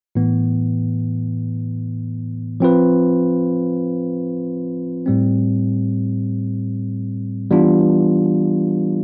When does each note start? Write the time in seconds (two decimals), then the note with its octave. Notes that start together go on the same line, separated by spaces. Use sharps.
0.15 A2 E3 B3
2.60 F3 C4 F4 B4
5.06 A2 G3 C4
7.50 E3 G3 B3 D4 F4